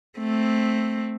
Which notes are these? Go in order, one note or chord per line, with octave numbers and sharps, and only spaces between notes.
A3 C4